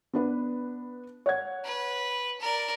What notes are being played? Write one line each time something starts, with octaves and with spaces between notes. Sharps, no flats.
B3 D4 B4
C#5 F#5 G#6
B4
A#4 D5